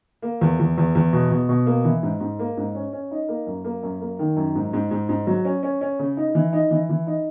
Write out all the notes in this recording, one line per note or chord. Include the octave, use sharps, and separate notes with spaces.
A#3
E2
E2
E2
E2
B2
B2
B2
A#3
E3
G#2
G#2
A#3
G#2
C#4
C#4
D#4
A#3
F#2
A#3
F#2
A#3
D#3
F#2
G#2
G#2
G#2
G#2
F#3
C#4
C#4
C#4
C#3
D#4
E3
D#4
E3
E3
D#4